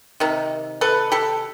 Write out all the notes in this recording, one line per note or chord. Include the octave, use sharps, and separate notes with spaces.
C3 D#3
A4 B4
G4 A4